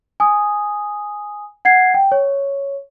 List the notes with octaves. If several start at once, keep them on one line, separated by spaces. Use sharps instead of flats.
G#5 D#6
F#5 G#6 C7
G5
C#5